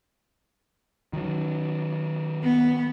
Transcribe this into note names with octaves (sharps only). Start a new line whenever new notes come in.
D#3 F#3
B3